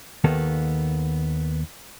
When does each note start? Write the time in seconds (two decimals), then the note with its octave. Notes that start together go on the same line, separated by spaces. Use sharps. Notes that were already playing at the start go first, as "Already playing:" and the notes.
0.24 D#2 D#3 A#3 B3 A4